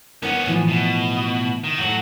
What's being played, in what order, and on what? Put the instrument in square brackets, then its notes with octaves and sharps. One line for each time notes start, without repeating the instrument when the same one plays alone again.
[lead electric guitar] B3 C#4 [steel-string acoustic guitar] A#4 F#5
[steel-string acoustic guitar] A2 E3 F3
[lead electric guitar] B2
D#3
[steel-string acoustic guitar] A2 A4 [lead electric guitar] F#3 F#4